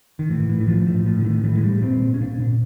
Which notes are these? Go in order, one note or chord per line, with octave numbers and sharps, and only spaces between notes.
D#3
A2 E3
A2
E3
A2 F3
A2
A2 F3
D3
A2 D#3
A2 E3
G#3
A2 G3
A#2 C4
A#2
C#4
A#2 D4
A#2